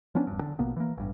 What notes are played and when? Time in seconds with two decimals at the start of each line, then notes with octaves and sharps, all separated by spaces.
0.15 F3 B3 C#4 D4
0.27 D#1 G2
0.41 D3
0.59 A#1 B2 A#3 B3
0.76 E3 A#3
0.97 A1 G2